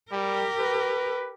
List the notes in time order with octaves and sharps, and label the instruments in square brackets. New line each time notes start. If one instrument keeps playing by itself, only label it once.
[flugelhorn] G3 [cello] G4 A#4
[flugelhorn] B4